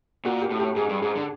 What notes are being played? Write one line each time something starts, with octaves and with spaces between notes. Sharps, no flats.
A#2 F#4
G4
A2
G4
G#2 G#4
G2
G#2 G#4
D3